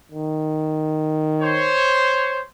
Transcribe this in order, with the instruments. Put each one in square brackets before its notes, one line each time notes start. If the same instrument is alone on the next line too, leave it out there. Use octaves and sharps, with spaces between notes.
[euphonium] D#3
[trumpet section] C5 C#5